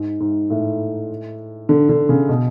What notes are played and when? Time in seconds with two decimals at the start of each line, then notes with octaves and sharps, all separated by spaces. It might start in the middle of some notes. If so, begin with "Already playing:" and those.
Already playing: G#2
0.20 G#2
0.50 A2
1.69 D3
1.89 D3
2.09 C#3
2.29 B2